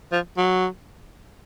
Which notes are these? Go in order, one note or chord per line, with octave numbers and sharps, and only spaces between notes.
F3
F#3